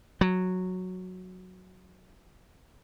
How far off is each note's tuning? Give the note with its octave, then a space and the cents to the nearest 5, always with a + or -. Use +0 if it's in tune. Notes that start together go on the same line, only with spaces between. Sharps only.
F#3 -5